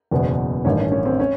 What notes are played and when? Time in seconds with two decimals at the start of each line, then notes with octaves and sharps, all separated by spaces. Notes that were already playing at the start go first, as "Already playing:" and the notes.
0.11 F#1 E2 B2
0.65 A1 G2 D#3 C#4
0.78 C#4
0.92 C#4
1.06 C4
1.20 C#4